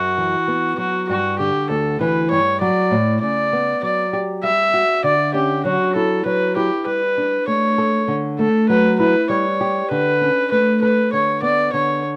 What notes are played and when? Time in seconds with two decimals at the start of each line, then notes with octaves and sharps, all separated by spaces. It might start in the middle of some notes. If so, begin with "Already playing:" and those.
Already playing: F#2 F#4
0.18 E3
0.48 B3
0.78 F#3 F#4
1.09 G2 F#4
1.39 D3 G4
1.69 D2 A4
2.01 E3 B4
2.31 G2 C#5
2.61 F#3 D5
2.91 A2
3.21 C#3 D5
3.53 B3
3.83 F#3 D5
4.13 G4
4.43 G3 E5
4.74 F#4
5.04 D3 D5
5.34 C#4 G4
5.65 F#3 F#4
5.96 E4 A4
6.25 F#3 B4
6.56 E4 G4
6.86 G3 B4
7.18 D4
7.48 A3 C#5
7.78 A4
8.08 D3
8.39 A3 A4
8.69 F#3 B4
9.00 E4 B4
9.30 G3 C#5
9.61 G4
9.91 D3 B4
10.21 C#4
10.51 A3 B4
10.82 A4 B4
11.12 D3 C#5
11.42 B3 D5
11.73 D3 C#5